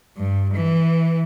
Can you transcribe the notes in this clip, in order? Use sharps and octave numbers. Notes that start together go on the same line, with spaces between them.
G2
E3